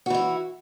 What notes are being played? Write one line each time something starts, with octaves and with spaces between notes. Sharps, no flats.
E3 E4 F#4